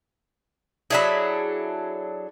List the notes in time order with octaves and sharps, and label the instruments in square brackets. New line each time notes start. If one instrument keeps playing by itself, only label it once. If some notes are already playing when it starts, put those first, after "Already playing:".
[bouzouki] F#3 D4 G#4 [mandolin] E4 A4 B5